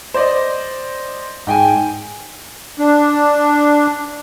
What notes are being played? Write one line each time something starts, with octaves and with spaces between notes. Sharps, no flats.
C5 D5 D#5
G#2 G5 G#5
D4